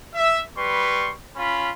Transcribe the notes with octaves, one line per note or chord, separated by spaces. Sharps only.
E5
G3 B4 C6 C#6
C#4 F4 B5